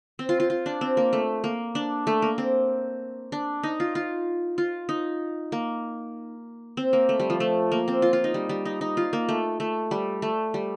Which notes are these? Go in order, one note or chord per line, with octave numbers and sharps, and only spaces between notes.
C4
F4
F4
F4
D4
C4
A#3
A3
A#3
D4
A3
A#3
C4
D4
D#4
F4
F4
F4
D#4
A#3
C4
A#3
A3
G3
F3
A3
A#3
C4
F4
F4
D#4
G3
G3
D#4
D#4
F4
A#3
A3
A3
G3
A3
G3